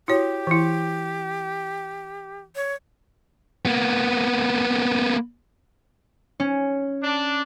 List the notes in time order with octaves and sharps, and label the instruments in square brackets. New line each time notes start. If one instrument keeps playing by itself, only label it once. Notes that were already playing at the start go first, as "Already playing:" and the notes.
[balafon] E4 F#4 C#5 [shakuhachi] G4
[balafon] E3 E4
[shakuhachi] C#5
[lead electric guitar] A#3 B3
[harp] C#4
[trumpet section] D4